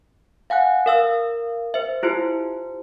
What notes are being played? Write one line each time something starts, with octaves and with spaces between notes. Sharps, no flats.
F5 F#5 G#5 F#6
A#4 F5 E6
C5 E5
E4 F4 G4 C5